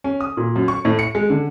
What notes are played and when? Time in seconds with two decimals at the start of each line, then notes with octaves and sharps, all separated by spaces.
0.04 C#4
0.21 D#6
0.37 A#2
0.56 F#2
0.68 C#6
0.85 A2
0.99 C#7
1.15 G#3
1.30 D3